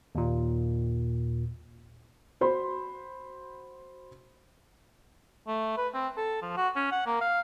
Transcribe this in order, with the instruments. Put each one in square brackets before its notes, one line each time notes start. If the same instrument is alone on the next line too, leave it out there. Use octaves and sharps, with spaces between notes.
[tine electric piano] D#2 A#2
[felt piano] F#4 C5 B5 C6
[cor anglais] A3
B4
C4
A4
F3
F#4
C#4
F#5
A#3
F5